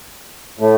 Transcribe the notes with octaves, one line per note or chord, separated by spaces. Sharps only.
A2 A3